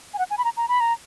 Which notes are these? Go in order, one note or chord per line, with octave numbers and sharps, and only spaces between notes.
G#5
F#5
G#5
B5
A#5
A#5
B5
A#5